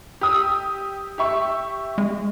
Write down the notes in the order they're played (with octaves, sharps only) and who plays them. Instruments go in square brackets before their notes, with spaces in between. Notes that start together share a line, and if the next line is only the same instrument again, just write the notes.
[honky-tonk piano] G4 D#6 E6
G4 E5 C#6
[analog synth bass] G#3